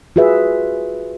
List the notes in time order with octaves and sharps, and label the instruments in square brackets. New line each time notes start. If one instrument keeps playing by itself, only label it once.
[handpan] F4 F#4 G#4 B4 E5